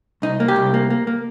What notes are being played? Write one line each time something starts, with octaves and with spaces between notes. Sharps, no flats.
C2 D#4
A#3
G4
C2
A#3
A#3
A#3